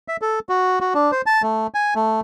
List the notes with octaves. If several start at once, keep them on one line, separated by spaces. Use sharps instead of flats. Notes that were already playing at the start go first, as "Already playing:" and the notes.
E5
A4
F#4
F#4
D4
C5
A5
A3
G#5
A3